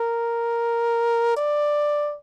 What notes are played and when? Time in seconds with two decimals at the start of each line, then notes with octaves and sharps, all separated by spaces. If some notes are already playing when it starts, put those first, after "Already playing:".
Already playing: A#4
1.37 D5